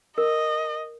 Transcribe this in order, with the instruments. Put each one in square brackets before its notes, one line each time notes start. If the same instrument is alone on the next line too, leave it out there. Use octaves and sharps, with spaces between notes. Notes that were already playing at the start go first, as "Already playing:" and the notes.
[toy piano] A#4 [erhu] D#5